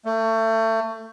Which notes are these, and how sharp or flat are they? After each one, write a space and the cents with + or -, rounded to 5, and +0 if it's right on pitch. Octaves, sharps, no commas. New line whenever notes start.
A3 +30